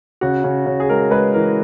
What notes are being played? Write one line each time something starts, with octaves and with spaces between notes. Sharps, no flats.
C#3 F#4
C#3
C#3
G#4
G#3 A#4
G#3 B4
E3 A#4